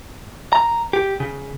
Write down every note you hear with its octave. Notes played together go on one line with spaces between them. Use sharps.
A#5
G4
C#3